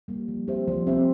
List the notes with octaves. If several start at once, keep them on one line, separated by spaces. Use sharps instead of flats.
G3 A#3
F3
C4 G4 C5 E5
F3
C4 G4 C5 E5